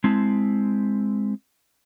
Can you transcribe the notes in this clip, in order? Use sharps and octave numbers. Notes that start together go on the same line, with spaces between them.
G#3 C4 E4 A5